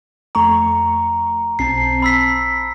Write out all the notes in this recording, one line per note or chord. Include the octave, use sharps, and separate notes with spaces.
F2 A3 A#5 C#6
B1 C4 A5 C7
B5 E6 B6